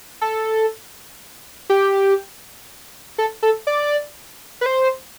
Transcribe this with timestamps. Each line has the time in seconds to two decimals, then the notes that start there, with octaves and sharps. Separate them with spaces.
0.21 A4
1.70 G4
3.18 A4
3.43 A4
3.67 D5
4.61 B4
4.66 C5